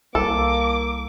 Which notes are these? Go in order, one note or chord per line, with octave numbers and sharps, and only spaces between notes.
C2 A#3 A4 D6